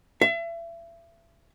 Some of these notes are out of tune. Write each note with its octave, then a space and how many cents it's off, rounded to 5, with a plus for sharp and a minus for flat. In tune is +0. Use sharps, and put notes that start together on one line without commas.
E5 +35